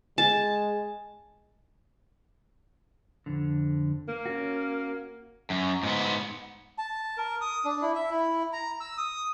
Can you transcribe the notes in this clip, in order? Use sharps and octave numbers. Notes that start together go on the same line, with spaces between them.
G#3 G#5 A5
F2 D3
A#3
C#4 F#4
F#2
G#2 B3
A5
A#4
D#6
D4
E4
E5
E4
A#5
E6
D#6